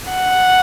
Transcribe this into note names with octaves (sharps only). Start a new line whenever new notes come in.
F#5